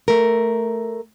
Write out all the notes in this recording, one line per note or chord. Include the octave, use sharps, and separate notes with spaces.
A3 A#4